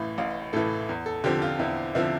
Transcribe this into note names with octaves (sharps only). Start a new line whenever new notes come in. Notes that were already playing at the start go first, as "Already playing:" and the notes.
Already playing: A1 A2 E3 F5
A1 F5
A2 E3 A4
E2
A4
D3 F3 C4 G4
F4
E2 E4
D3 F3 C4 E4